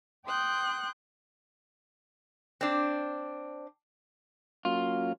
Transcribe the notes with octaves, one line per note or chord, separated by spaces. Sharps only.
G5 C6 D#6 F#6 G6
C4 D4
F#3 A#3 C#4 F4